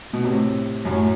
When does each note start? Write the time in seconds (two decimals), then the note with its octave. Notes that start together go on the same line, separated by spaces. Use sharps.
0.13 B2
0.25 A2 C3
0.85 F#2 A2